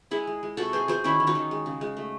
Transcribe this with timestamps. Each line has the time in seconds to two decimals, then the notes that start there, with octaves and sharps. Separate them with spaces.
0.11 G#3 E4 G#4
0.27 G#3
0.43 G#3
0.57 C3 F#4 A4
0.73 F#3 G#4 C5
0.88 F#3 G#4 C5
1.04 D#3 C#4 E4
1.20 D#3
1.27 D#4 F#4
1.35 D#3
1.51 G#3
1.66 C#3
1.81 G#3
1.97 A3